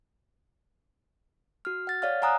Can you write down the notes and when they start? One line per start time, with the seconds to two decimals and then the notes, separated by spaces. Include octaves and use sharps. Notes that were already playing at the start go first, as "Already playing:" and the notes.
1.65 F#4 F6
1.87 F#5 A6
2.02 C#5 D5 F5 F6
2.22 F#5 G#5 A#5 D#6 F#6